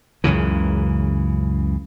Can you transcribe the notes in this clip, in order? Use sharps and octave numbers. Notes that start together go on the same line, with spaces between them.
C#2 F#2 C#3 E3